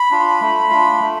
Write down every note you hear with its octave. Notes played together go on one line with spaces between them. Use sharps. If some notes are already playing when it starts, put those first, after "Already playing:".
Already playing: B5
D4 F4
A3
D4 F4
A3